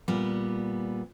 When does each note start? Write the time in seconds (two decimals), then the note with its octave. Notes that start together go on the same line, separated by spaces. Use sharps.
0.08 A#2 G3 B3